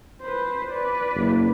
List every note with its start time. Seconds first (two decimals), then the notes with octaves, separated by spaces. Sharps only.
0.22 B4 C5
0.71 B4 D5
1.15 F#1